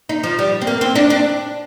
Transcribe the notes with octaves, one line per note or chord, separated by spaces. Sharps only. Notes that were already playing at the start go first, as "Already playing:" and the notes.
D#4
F3
G3
C4
A#3
C4
D4
D4